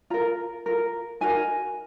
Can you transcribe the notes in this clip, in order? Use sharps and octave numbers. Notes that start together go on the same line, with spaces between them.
F4 A#4 A#5
F4 A#4
D#4 F#4 A#4 G#5